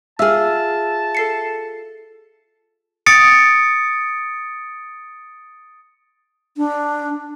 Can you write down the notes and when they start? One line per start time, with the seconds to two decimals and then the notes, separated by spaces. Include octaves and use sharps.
0.19 F4 G#4 E5 A5 E6 F6
1.15 A4 C7 C#7
3.06 D#6 A6 C#7 D7
6.57 D4